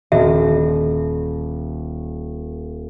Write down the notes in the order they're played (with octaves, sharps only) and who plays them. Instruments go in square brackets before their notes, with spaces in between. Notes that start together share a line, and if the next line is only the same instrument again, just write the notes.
[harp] D#1 [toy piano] F#4 D#5 E5